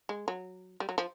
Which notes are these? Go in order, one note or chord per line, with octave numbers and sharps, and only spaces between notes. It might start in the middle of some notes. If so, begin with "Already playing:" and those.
G#3
F#3
G3
F#3
F3